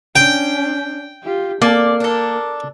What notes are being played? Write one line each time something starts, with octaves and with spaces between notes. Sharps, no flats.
C#4 D4 G5
F4 G4
A#3 C4 A4 D5
D4 A4 A#4